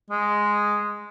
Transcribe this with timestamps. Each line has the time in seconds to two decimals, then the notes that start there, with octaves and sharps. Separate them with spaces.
0.10 G#3